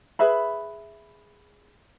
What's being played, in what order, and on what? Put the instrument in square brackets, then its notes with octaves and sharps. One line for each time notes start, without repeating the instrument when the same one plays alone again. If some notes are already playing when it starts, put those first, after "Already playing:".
[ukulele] G#4 B4 E5 B5